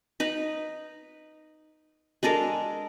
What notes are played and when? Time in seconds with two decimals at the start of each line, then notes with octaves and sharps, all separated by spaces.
0.20 D#4 B4
2.23 G#3 D4 A4 A#4